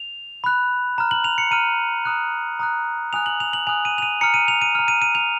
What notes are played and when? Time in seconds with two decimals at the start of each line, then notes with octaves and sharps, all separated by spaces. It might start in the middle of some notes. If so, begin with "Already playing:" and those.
Already playing: F7
0.44 B5 F#6
0.98 A#5 F6
1.11 F#7
1.24 F7
1.38 C#7
1.51 A#5 F6 D#7
2.05 A#5 D#6 F#6
2.60 A#5 D#6 F#6
3.13 G#5 D#6 F#6 F7
3.26 F#7
3.40 F7
3.53 F#7
3.67 G#5 D#6 F#6 F7
3.85 D#7
3.98 F7
4.02 D#7
4.21 A#5 F6 C#7
4.34 D#7
4.48 F7
4.62 D#7
4.75 A#5 F6
4.88 D#7
5.02 D#7
5.15 F7